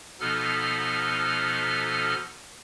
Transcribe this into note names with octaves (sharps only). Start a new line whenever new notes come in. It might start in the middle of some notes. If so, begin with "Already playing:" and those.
B2 F3 B3 D#4 A4 F6